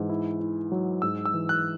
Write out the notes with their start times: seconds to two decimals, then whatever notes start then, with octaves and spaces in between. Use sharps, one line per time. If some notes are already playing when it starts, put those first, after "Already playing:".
Already playing: G#2 E3
0.10 E4
0.40 E4
0.72 F#3
1.02 G#2 E6
1.25 E6
1.34 E3
1.49 F#6